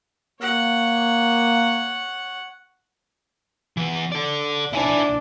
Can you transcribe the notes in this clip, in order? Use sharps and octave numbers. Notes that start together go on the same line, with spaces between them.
A#3 C#5 F#5
E3 B3
A4 D5
D4 E4 G#5